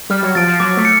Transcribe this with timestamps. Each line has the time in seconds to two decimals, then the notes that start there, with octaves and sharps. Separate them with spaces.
0.10 G3 F6
0.23 F#3
0.35 F3 A6 D7
0.47 F3
0.60 F#3 D6
0.77 A3
0.85 C#7